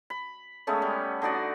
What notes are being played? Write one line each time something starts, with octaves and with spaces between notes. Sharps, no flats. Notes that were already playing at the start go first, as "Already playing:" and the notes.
B5
G#3 A3 B3 C#4
G3
D3 D#4 F#4 D5